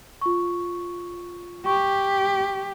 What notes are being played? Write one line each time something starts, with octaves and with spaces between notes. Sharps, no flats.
F4 C#6
G4 C#6